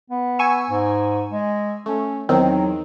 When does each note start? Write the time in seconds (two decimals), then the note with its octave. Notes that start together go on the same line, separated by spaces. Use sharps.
0.10 B3
0.39 G#5 C#6 E6
0.70 G#2
1.30 G#3
1.86 A3 C#4
2.29 E2 D#3 F#3 C4